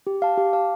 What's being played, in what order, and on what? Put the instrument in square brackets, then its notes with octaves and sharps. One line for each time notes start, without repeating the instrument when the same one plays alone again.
[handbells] G4
F5 A5
G4
F5 A5